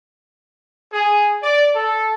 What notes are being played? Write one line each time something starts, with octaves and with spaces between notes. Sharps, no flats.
G#4
D5
A4